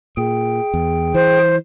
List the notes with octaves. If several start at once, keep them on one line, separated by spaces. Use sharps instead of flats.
A#2 G#4 G5
E2
E3 C5